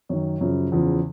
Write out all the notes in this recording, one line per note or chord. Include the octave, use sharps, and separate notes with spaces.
F#2 D#3 C#5
F#2 C#3 F3
E2 C#3 F3